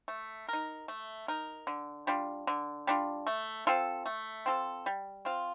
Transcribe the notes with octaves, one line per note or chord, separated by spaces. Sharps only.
A3
D#4 A#4
A3
D#4 A#4
D3
G3 D4 F4
D3
G3 D4 F4
A3
C4 F4 A4
A3
C4 F4 A4
G3
C4 F4